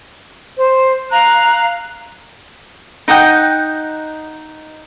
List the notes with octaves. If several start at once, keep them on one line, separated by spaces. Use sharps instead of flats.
C5
F5 A#5 F#6
D#4 D#5 F#5 G5